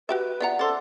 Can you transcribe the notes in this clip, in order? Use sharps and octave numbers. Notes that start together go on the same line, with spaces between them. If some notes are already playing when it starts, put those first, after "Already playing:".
F#4 G4 B4 E5
B3 F4 D5 E5 F#5 A#5
C#4 A4 C5 C6 D6 A6